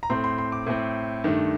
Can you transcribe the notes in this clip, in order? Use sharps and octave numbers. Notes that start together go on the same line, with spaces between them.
A#5
A2 A3 C4 C6
C6
C6
D6
A2 A3 C4
G2 D#3 A3